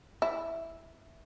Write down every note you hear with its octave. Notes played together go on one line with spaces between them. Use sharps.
E4